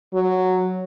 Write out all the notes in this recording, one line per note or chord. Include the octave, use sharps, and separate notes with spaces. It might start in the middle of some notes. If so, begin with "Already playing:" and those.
F#3